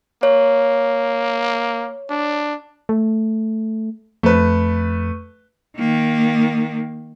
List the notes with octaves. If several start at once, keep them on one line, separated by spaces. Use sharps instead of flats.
A#3 C#5
D4
A3
F2 A3 B4
D#3 A#3